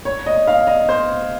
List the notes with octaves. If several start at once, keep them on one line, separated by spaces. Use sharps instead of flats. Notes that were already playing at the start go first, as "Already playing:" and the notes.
C#5
D#5
F5
D#5
C5